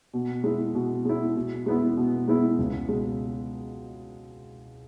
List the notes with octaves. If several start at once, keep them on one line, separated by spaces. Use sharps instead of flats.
B2
G#3 E4
B2
G#3 E4
B2
G#3 B3 E4
B2
G#3 B3 E4
C#2
B2 G#3